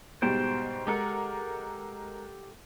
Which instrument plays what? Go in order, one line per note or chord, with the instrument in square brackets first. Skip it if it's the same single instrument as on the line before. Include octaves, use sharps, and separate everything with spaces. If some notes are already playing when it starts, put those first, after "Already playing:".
[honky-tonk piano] G#2 B2 G3 [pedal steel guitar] C5 G5 A5
[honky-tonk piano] G#3 A#4 [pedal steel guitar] G4 A4 F#5